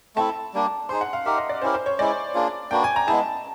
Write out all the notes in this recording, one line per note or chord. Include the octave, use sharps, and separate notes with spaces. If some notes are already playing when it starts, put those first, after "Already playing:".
A3 C4 E4 A4 A5
G3 A#3 D4 G4
D#4 G#4 C5 C6
F#5
F5
D#4 G4 A#4 E5
D#5
D5
C#4 E4 G4 A#4 C5
C5
C#5
G#3 C#4 E4 D5
A#3 D4 F4 G#4
A#3 D4 F#4 B4 G5
G#5
A#5
G#3 B3 E4 G#4 A5